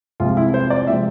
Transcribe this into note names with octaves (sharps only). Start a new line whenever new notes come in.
C2 C3 F3 G#3 C4 F4
E4
C5
D5
C3 F3 G#3 C4 E5